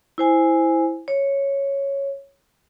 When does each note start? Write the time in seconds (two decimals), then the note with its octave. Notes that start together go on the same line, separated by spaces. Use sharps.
0.18 E4 C5 G#5
1.08 C#5